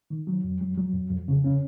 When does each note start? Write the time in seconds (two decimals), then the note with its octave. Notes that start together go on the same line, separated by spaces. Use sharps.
0.10 D#3
0.27 F#3
0.44 F2
0.61 F#3
0.77 F#3
0.94 F2
1.10 F2
1.28 C#3
1.44 C#4